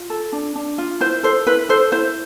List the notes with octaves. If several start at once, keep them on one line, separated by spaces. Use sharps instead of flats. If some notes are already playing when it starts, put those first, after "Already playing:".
Already playing: F4
A4
D4
D4
F4
E4 C5
A4 C5
E4 B4
A4 C5
E4 C5